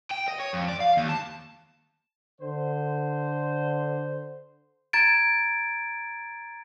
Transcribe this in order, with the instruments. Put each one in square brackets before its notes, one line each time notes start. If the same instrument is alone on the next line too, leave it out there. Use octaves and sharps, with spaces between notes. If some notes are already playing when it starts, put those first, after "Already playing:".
[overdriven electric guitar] G5
D#5
C#5
F2
D5
F5
D#2
A5
[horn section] D3 C5
[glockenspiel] A#5 G#6 A6 D7